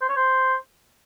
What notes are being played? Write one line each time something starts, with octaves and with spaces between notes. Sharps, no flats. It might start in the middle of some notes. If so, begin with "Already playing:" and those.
C5
C#5
C5